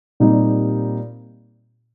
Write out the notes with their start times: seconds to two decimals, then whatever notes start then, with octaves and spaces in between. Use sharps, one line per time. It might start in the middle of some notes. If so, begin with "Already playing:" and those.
0.20 A#2 G3 C4 D#4 G4